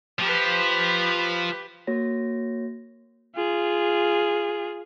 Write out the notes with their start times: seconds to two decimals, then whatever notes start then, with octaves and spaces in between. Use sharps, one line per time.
0.19 F3 G4 B4
1.87 A#3 F#4 C#5 A#6
3.35 F4 G#4